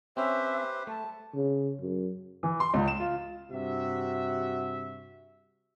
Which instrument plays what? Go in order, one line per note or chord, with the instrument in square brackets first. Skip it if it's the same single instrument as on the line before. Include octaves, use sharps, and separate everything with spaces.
[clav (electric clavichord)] C4 C#4 [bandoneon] G4 B4 C5 [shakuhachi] E5
[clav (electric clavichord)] A3 [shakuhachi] A5
[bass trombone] C#3
F#2
[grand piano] E3
C6
C#2
E7
F4
[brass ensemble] G2 C3 F#4 E5